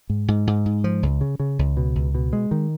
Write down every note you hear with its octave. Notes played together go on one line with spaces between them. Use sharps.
G#2
G#2
G#2
G#2
F3
C#2
C#3
C#3
C#2
B2
C#2
B2
G#3
D#3